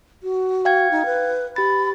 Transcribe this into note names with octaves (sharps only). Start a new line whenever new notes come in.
F#4
F5 G5 G#6
D#4
B4
G4 B5 A6